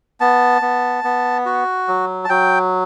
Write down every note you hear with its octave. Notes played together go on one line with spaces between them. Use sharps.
B3 A5
B3
B3
F#4
F#3
A5
F#3 G5